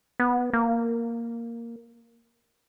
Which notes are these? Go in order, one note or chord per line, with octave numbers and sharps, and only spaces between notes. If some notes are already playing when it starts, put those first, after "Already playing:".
B3
A#3